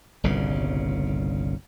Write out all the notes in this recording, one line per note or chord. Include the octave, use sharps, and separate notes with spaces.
G1 C2 A#2 C#3